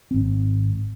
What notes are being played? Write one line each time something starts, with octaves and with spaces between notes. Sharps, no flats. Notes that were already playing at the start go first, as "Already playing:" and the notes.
G#1 C4